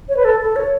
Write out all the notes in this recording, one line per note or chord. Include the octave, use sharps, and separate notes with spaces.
C#5
B4
A4
A4
C#5